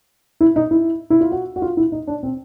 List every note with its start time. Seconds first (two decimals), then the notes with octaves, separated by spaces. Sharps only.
0.41 E4
0.56 D#4
0.71 E4
1.10 E4
1.21 F4
1.32 F#4
1.56 F#4
1.62 F4
1.77 E4
1.92 D#4
2.07 D4
2.23 C4